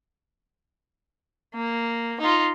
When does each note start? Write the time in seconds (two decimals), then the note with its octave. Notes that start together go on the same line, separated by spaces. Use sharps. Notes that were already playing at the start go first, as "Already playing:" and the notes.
1.55 A#3
2.20 D#4 F4